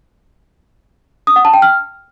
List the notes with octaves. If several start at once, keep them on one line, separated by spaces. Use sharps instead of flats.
D#6
F#5
A5
G5
F6